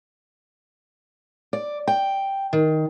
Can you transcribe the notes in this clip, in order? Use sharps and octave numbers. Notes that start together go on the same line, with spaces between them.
D5
G5
D#3